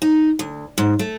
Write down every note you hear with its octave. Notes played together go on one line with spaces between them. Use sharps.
D#4
D2
G#2
A3